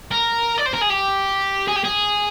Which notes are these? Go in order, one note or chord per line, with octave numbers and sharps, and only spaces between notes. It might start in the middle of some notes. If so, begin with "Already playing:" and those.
A#4
D5
C5
A#4
G#4
G4
G#4
G4
G#4